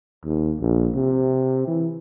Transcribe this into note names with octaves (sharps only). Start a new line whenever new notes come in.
D#2
A#1
C3
E3